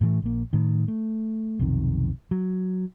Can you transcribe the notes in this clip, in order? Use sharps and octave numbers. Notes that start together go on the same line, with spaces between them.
A2 E3 A3
A#1 A#3
A2 D#3
A3
B1 F2 C3 D#3
F#3